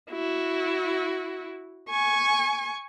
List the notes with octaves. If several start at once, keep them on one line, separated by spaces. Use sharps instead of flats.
E4 F#4
G#5 C#6